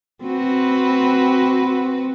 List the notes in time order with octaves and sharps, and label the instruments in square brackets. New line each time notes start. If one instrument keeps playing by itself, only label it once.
[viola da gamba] C4 F#4 B4